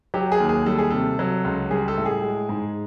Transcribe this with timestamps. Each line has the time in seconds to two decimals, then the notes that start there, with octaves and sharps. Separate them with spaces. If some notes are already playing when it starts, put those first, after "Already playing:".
0.14 F#3 G4
0.32 G#4
0.40 D#2
0.49 G#4
0.66 G3 A4
0.78 G#4
0.90 C3 A4
1.19 F#3
1.44 C#2
1.71 G3 G#4
1.88 A4
1.97 A2
2.06 G#4
2.23 G#3
2.49 G#2